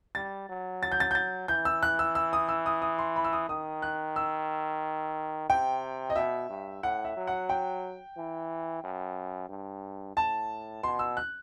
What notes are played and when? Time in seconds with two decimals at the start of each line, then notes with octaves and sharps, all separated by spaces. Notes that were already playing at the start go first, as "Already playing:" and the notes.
0.15 G3 A6
0.49 F#3
0.83 A6
0.92 G6
1.00 A6
1.11 G6
1.15 A6
1.48 E3 G6
1.65 E6
1.83 F#6
1.99 E6
2.15 E6
2.33 D#6
2.49 E6
2.66 D#6
2.82 D#6
2.99 C6
3.16 B5
3.24 E6
3.33 D#6
3.49 D#3 D#6
3.82 F#6
4.16 E6
5.49 C3 G5
6.10 D#5
6.16 B2 E5
6.49 G2
6.83 A2 F#5
7.05 E5
7.16 F#3
7.27 F#5
7.49 G5
8.17 E3
8.84 F#2
9.49 G2
10.16 A2 A5
10.83 B2 C6
10.99 E6
11.17 F#6